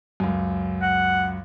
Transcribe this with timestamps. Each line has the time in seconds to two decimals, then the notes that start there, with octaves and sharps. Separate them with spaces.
0.20 C#2 F#2
0.82 F#5